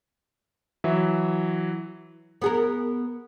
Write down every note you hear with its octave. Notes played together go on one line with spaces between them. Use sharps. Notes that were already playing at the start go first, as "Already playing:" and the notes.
E3 F#3 E5
B3 G#4 A#4